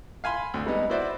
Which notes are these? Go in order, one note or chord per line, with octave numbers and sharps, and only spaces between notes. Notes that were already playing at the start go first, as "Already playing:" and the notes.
F5 G#5 B5 C6
D2
G3 G#3 B3 D#4
E4 F#4 B4 C5 D5 E5